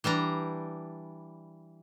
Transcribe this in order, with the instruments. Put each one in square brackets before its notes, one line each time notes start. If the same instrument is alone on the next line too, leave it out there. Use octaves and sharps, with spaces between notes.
[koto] E3 G3 D4 A#5